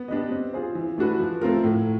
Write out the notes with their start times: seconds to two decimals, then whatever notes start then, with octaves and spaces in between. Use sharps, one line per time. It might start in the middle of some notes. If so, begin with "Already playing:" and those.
Already playing: B3
0.08 D4 G4 B4 D#5
0.31 C4
0.53 F4 G#4 C5
0.75 E3
0.98 A3 D4 F#4 B4
1.20 F3
1.41 A3 C4 F4 A#4
1.64 A2